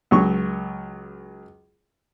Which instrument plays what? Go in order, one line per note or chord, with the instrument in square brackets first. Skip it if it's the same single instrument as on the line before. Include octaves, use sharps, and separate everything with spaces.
[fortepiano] C#2 F#3 C#6